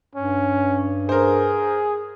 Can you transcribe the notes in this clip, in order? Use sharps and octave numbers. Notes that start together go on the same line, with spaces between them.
G2 C#4
G#4 A#4 C5